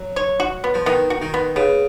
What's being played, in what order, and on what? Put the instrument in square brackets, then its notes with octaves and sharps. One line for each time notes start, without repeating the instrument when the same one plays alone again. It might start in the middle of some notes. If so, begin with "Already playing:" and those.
Already playing: [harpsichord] F#3
[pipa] C#5
F#4
B3
[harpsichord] F3
[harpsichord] D#3 [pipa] B3
[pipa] F#4
[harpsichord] D#3
[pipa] B3
[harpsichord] C#3 [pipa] B3